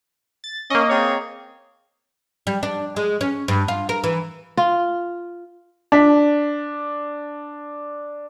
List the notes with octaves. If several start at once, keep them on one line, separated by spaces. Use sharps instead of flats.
A6
A#3 C#4 D#5
C4 G#4 C#5
G3
D4
G#3
C#4
G2
F4
A#4
E3
F4
D4 B6